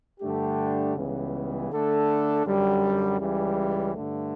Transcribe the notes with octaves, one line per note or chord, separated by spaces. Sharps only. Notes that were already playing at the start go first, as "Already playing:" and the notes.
G2 D3 A3 D4 G4
C#2 C#3 E3 G3 B3
D3 A3 D4 A4
F#2 D3 G3
C#2 C#3 E3 G3
G2 D3 A3